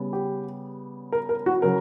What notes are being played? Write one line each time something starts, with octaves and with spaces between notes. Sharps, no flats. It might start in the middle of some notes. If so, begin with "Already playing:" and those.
Already playing: C#3 G3 B3
G4
A#4
A#4
F#4
C#3 F#3 A#4